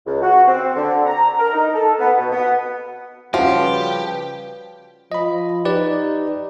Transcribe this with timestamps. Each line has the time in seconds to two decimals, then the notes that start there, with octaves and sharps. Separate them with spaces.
0.06 C#2
0.22 F#4
0.47 C4
0.76 D3
1.06 A#5
1.39 A#4
1.53 D#4
1.75 A4
1.99 B3
2.18 B2
2.31 B3
3.34 C#3 F3 G3 C#4 F#4 G4 B4
5.12 F3 D#5 B5
5.65 D#4 G4 B4 D5